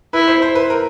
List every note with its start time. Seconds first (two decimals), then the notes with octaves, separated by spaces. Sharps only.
0.13 E4 B4
0.28 C5
0.42 C5
0.55 B4
0.70 A#4